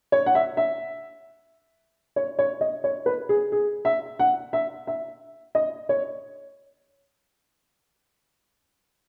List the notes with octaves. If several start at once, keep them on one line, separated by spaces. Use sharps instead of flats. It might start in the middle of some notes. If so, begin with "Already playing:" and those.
C#5
F#5
E5
E5
C#5
C#5
D#5
C#5
B4
G#4
G#4
E5
F#5
E5
E5
D#5
C#5